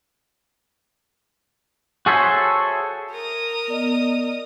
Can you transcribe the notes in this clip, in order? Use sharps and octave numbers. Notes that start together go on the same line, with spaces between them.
F#4 G#4 A4 C5 C#5 E5
A#4 D#6
B3 D5 D#5